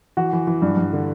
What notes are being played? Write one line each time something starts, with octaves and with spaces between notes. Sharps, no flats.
E3 F#4
E3
E3
G2
G2
D3